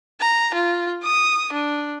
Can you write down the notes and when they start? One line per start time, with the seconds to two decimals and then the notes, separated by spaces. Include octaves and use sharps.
0.20 A#5
0.55 F4
1.03 D#6
1.53 D4